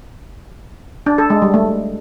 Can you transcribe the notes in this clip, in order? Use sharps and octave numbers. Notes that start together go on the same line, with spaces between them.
D4
A4
G#3
G3
A3